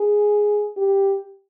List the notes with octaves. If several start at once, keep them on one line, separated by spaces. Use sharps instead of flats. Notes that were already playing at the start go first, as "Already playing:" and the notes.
Already playing: G#4
G4